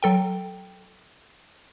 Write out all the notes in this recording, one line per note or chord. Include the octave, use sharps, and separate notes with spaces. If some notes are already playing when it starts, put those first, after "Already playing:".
F#3 A4 G5